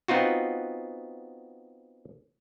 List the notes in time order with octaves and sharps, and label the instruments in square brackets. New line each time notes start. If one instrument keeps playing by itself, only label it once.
[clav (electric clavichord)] B3 C4 D#4 F4 F#4